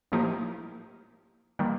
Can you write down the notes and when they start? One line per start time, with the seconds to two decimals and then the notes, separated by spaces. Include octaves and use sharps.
0.12 A2 F3 A#3 D#4 G4
1.59 D#3 G3 A#3